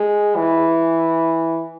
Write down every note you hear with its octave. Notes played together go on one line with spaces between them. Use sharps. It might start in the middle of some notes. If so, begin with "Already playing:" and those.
Already playing: G#3
E3